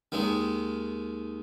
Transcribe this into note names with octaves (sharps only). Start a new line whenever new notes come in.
D#2 D#3 G#3